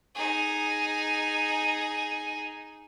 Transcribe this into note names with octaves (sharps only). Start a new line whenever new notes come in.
D#4 G#4